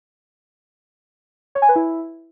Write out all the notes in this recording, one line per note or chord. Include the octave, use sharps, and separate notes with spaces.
C#5
G#5
B4
E4